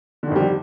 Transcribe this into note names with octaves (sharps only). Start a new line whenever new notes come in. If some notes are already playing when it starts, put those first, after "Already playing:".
F2 D3 D#3 G3